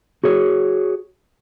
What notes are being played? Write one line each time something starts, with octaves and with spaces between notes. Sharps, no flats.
F#4 G#4 C#5